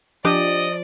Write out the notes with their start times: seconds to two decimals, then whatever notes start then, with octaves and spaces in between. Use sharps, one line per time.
0.25 F3 D4 G4 D5 D#5 G#5